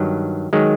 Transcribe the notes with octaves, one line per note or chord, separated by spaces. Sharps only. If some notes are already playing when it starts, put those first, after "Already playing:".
Already playing: G2 D#3 F#3
D#3 F#3 G#3